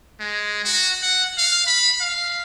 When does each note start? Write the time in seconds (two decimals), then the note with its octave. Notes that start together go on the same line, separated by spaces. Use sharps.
0.20 G#3
0.65 F#4
1.03 F#5
1.38 F5
1.67 B5
2.00 F5